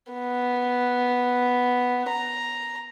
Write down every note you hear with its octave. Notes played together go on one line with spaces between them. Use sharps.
B3
A#5